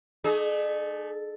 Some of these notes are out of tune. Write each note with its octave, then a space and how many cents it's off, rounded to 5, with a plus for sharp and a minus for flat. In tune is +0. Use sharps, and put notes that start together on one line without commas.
A3 +0 D#4 -45 G#4 +30